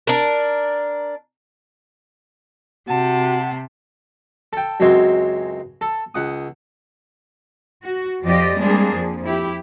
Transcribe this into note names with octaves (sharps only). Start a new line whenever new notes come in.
D4 A#4
C3 F#4 F#5 A5
A4 G5
C#2 F#2 F#3 G#3 C4
A4
C#2 F#5 D#6
F#4
F2 F3 F4 G4 D5 D#5
G3 G#3 A#3 C4 D4 G#4
F2 F3
E4 G4